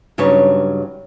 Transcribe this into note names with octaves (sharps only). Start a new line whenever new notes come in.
G2 C#3 F#3 D#4 B4 C#5